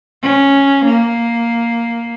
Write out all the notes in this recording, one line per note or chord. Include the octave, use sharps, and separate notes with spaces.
C#4
A#3